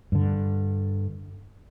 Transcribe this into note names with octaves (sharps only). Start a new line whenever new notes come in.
G2 D3